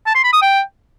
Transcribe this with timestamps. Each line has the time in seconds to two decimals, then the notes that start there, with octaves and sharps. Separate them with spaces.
0.06 A5
0.15 C6
0.24 B5
0.33 D#6
0.42 G5